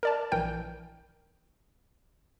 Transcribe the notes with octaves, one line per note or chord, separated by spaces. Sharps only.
A#4 D5 A5
A#1 E3 A#4 G5 G6